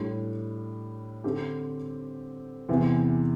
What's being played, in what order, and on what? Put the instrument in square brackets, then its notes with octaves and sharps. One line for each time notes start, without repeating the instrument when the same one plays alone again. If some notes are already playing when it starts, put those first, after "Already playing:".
Already playing: [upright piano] A2 G3 D4
D3 C4 G4
E2 C3 E3